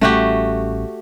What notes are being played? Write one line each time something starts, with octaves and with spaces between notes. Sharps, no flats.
A1 G3 A3 C#4 F#4 G4